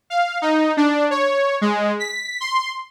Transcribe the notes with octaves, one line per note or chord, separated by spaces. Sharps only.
F5
D#4
D4
C#5
G#3
B6
C6